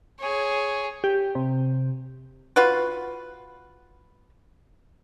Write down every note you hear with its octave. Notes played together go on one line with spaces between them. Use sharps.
G#4 C#5
G4
C3
F4 F#4 B4